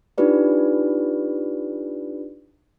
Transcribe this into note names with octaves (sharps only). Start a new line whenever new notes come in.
D4 D#4 F4 G4 B4 D5